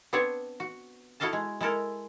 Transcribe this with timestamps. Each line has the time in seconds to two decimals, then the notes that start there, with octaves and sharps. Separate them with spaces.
0.13 B3 C4 D4 C5 C#5
0.60 F#4
1.20 E4 F#4 A4 D#5 F5 A5
1.33 G#3
1.61 G#3 E4 A4 A#4